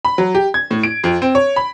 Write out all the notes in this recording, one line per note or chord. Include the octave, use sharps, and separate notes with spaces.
B5
F#3
G4
G#6
A2
D7
F2
C4
C#5
B5